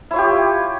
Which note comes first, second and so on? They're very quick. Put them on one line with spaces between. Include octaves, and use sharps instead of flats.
E4 C#5 F4 G4